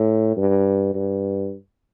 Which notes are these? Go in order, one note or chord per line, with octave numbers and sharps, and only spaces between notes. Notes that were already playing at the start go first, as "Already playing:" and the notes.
Already playing: A2
G2
G2